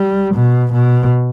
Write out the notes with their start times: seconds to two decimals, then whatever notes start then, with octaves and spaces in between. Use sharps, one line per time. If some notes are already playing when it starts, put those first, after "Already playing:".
Already playing: G3
0.35 B2
0.73 B2